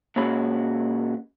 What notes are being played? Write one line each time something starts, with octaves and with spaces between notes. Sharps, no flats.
A#2 G#3 C#4 F#4 B5